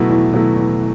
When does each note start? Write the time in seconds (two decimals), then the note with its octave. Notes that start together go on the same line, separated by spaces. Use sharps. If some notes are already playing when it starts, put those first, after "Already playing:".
Already playing: B2 F#3 A3 E4
0.09 E2
0.33 B2 F#3 A3 E4
0.56 E2